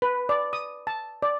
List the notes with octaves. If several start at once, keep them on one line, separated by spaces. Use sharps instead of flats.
B4
D5
D#6
A5
D5